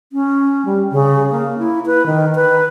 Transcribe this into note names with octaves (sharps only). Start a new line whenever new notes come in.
C#4
G3
C#3
A#3
E4
B4
D#3
B4